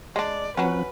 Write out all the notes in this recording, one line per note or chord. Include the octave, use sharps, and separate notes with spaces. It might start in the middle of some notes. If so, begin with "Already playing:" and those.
G#3 D4 D5
F3 F#3 C4 C#4 B4 F#5